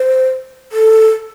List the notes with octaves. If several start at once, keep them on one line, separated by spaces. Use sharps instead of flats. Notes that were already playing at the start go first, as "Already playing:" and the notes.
Already playing: C5
A4